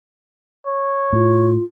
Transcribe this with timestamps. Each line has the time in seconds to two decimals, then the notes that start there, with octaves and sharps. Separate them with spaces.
0.67 C#5
1.13 A2 F4